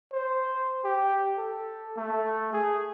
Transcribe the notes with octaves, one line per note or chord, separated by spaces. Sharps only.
C5
G4
A4
A3
G#4